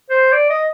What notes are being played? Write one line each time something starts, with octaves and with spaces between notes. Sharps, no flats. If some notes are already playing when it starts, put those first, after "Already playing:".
C5
D5
D#5